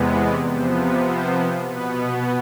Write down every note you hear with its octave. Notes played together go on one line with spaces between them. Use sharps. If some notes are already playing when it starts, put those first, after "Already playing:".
Already playing: E2 C3 G#3 B3
D5
C3 F3 B3 C5
B4
C5
B2 B3 B4